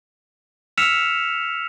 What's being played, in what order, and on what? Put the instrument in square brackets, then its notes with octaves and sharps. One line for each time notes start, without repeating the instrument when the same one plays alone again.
[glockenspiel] E6 F6 B6 C#7 E7 F7